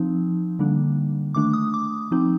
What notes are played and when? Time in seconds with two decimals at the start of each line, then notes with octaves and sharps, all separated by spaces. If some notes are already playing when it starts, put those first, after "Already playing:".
Already playing: F3 C4 D#4
0.59 D3 G3 A#3 D4
1.35 D#3 A3 D4 D6
1.53 D#6
1.74 D6
2.11 F3 C4 D#4